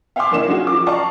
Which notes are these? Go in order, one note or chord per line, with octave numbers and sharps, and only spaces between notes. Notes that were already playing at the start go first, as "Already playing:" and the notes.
E5 F5 G5 G#5 C6 D6
F#1 E3 A#3 D4 D#5 E7
F#3 C#4 D#4 F4 F#4 G#4
F3 D6
D5 D#5 F5 A5 A#5 C#6